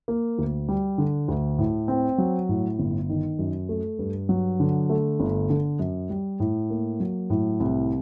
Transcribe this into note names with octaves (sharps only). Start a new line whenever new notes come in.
A#3
D2
G3
D3
D2
A2
C4
F#3
A2
G1
D#3
F#2
A3
G2
F#3
D3
A3
G1
D3
F#2
G3
A2
A#3
F#3
A2
C2